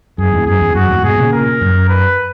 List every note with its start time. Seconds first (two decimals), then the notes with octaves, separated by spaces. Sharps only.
0.18 F#2 G#4
0.33 E2 G#2
0.46 F#2 G#4
0.61 E2
0.75 F#2 F#4
0.89 E2 G#2
1.04 G#2 B2 G#4
1.18 A#2 C#3
1.32 A#4
1.61 F#2
1.89 B4